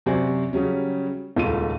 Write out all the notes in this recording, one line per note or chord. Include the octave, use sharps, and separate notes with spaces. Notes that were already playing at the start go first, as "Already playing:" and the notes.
F#2 C3 F#4 C5 D5 G#5
C#3 F#3 G3 C#4
D#1 C#2 F4 A4 D#7